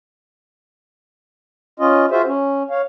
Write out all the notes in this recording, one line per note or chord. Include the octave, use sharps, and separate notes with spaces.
C#4 F4 D#5
F4 F#4 G#4 C5 E5
C#4
C#5 F5